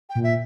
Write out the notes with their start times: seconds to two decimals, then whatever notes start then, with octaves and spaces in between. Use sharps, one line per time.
0.09 G5
0.15 A#2
0.23 E5